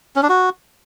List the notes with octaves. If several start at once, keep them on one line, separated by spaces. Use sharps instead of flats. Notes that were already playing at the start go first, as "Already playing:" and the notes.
C#4
D4
F#4